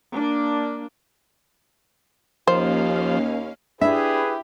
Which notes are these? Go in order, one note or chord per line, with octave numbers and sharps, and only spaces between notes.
A#3 D4
D#2 F3 A#3 C#4 C5 F5
D4 E4 G4 G#4 B4 E5